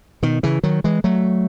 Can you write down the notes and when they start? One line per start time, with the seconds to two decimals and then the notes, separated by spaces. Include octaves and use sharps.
0.23 B2 D#3
0.43 C#3 E3
0.63 D#3 F#3
0.84 E3 G#3
1.04 F#3 A3